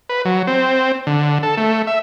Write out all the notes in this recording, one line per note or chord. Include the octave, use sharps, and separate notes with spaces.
B4
F#3
C4
D3
A4
A3
E5